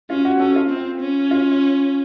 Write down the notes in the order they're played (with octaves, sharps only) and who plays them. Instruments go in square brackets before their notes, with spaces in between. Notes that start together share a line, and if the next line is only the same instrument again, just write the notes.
[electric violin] C#4 [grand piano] F4
[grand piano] F#4
[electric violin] C#4 [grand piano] A4
[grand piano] F4
[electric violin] C4
C#4
[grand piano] F4